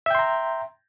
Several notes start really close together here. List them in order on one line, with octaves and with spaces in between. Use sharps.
E5 G5 C6 A#5